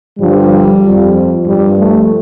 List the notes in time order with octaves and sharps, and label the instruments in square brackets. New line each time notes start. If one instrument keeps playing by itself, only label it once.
[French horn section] G2 D3 F3 G3
F2 F3
G2 F3 G3
A3